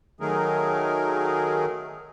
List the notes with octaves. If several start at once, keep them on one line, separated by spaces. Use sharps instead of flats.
D#3 F#3 A3 G#4 A#4